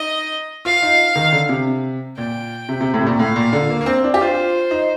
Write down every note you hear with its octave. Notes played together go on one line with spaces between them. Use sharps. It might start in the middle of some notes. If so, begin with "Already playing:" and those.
Already playing: D#4 D#5
F4 F5
D#4
D#3
D3
C3
A#2 G5
C3
C3
A2
C3
A#2
A2 F5
A#2
D3
A#3
A#3
C4
D4
G4
F4 C5
D#4